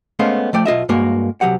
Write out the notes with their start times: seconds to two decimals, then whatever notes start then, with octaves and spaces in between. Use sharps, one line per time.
0.19 G#3 A3 B3 C#4 C5 F5
0.53 F3 A3 D5 G5
0.65 B1 F4 D#5 E5
0.89 G2 G#3 A#3 F#4
1.41 C2 F#3 G4 F#5